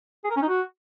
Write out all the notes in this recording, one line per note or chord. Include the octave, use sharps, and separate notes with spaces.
G#4
A#4
C#4
D#4
F#4